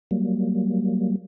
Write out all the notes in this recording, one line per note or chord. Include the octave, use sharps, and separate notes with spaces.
F#3 G3 A#3